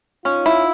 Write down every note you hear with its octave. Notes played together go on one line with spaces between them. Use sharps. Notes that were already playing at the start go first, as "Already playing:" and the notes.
C#4 D#4 F4
E4